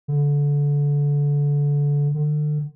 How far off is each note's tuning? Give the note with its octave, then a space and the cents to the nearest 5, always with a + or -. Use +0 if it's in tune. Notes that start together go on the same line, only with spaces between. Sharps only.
D3 -25
D3 +35